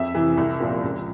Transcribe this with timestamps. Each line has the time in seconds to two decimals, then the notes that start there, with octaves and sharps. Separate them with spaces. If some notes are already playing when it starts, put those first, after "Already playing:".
Already playing: F2 E5
0.15 C3 E3
0.37 C2
0.60 A#2 F3
0.83 C#2